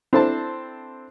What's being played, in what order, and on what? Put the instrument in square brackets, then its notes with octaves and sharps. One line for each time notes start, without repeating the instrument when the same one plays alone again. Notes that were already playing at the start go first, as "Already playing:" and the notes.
[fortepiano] C4 D4 E4 A4 C5 A5